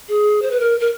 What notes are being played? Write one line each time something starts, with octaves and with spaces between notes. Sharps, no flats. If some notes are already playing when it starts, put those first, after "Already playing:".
G#4
C5
B4
A#4
A#4